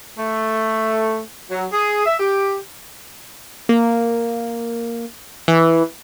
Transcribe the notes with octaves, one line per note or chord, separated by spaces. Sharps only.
A3
F#3
G#4
E5
G4
A#3
E3